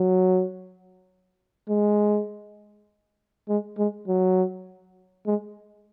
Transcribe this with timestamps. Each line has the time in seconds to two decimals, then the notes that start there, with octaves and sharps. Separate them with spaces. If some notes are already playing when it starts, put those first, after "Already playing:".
Already playing: F#3
1.69 G#3
3.49 G#3
3.78 G#3
4.08 F#3
5.26 G#3